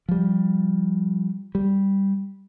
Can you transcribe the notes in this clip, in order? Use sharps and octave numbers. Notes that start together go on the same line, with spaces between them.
F3 G3
G3